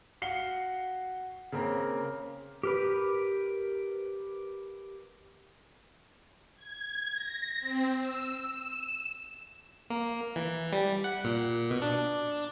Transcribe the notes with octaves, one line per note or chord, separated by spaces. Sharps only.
F#4 F5 C7 C#7 G7
C#3 A#3 C4 A#4
G4 A#4 B4
G#6
A#6
C4
E6
E7
A#3
E3
G3
F#5
A#2
B2
D4